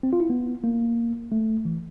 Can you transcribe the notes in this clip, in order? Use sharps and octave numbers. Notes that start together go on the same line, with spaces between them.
C4
F4
E4
B3
A#3
A3
E3